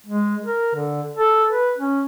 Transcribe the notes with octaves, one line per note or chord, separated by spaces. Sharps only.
G#3
A#4
D3
A4
B4
C#4